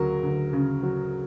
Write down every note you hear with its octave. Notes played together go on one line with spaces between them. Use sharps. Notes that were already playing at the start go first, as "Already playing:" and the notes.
Already playing: D2 C#3 F#3 A#4
D2
C#3
F#3